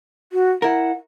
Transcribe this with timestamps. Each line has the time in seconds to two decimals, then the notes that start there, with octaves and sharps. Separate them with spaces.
0.33 F#4
0.62 E4 A#4 F#5